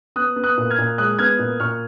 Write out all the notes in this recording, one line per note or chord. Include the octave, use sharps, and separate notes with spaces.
B3 D#6 F#6
B3
D#6 F#6
A#2
F6 G#6
A#2
G#3 D#6 F#6
B3 F6 G#6
A#2
A#2 C#6 F6